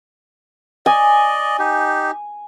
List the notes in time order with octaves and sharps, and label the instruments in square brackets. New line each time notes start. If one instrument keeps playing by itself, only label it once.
[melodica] D5 D#5 [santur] G#5
[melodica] D#4 G4